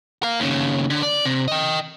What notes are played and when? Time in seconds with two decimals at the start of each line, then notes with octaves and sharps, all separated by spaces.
0.23 A#4 F5
0.40 D#2 C#3
0.90 D3
1.03 D5
1.25 C3
1.48 D#5 G5